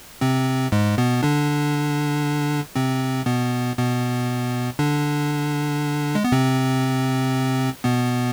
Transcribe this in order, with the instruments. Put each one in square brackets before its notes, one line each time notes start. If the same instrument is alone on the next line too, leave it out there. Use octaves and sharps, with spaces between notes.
[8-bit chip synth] C3 C4
G#2 G#3
B2 B3
D3 D4
C3 C4
B2 B3
B2 B3
D3 D4
G#3
B3
C3 C4
B2 B3